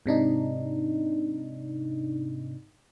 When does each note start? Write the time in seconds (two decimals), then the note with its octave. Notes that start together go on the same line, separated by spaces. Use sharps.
0.06 G#2 C3 D4 D#4